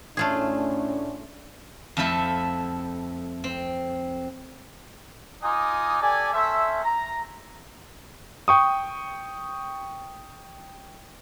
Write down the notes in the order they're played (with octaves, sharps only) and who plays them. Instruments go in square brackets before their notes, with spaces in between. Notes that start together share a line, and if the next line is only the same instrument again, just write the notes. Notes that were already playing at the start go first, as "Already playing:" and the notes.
[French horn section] A2 C#4 D4 [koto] A3 F4 G#4
[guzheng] F2 F3 A3 E4 A4 E5
C4
[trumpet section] D#4 F4 G#5 D6 D#6
G4 A4 D5 G#5
C#4 A4 C5 E5
A#5
[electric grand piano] G5 C#6 D#6